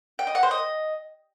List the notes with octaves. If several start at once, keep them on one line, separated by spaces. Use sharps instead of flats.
G5
D#5
F#5
C5
D#5